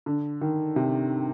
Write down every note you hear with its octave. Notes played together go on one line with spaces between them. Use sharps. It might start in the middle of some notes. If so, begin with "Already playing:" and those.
D3
D#3
C3